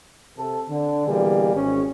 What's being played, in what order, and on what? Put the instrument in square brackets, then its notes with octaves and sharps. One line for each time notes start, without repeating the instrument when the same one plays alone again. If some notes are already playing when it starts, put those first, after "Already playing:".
[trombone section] C3 A4
D3
B2 E3 G3 A#3 G#4
G#1 C#4